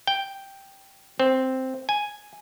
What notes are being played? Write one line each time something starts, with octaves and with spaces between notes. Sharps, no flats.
G5
C4
G#5